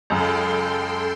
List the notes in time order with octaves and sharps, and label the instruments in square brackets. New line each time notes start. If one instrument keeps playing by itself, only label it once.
[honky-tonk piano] C#2 F#2 [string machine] A4 G5 C6